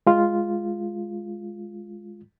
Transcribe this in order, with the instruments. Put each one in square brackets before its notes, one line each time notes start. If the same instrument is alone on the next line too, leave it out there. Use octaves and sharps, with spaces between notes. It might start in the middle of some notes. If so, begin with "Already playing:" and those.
[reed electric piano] G#3 F4